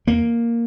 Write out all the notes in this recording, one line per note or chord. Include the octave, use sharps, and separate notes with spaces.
E2 A#3